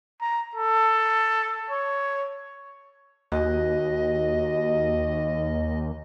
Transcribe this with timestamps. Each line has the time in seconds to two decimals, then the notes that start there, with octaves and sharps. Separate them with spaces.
0.21 A#5
0.56 A4
1.70 C#5
3.32 D#2 F#4 D#5